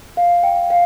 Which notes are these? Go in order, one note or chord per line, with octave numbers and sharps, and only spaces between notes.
F5
G5
F5